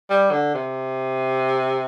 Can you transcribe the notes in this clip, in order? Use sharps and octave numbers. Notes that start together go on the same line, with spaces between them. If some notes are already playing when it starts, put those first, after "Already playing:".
G3
D3
C3